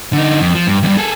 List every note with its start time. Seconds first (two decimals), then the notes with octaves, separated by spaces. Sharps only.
0.13 D3 D#4
0.41 F2
0.55 F3
0.67 G2
0.83 E2 G2
0.97 G#4 A4